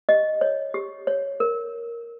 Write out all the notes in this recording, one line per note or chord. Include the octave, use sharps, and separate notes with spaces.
G4 D#5
C#5
G4
C#5
A#4